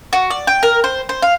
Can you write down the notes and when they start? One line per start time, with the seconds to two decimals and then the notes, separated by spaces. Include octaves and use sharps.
0.13 F#4
0.30 D5
0.47 G5
0.63 A#4
0.84 C5
1.09 C5
1.22 F5